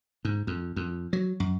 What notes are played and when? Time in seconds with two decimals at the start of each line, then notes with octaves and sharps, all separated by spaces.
0.25 G#2
0.47 F2
0.76 F2
1.13 F#3
1.40 F#2